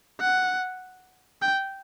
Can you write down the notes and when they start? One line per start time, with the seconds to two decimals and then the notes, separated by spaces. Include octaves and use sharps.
0.20 F#5
1.42 G5